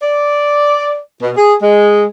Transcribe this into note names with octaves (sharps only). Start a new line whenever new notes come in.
D5
B2
G#4
G#3